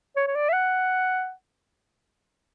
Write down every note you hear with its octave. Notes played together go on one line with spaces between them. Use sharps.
C#5
C#5
D5
E5
F#5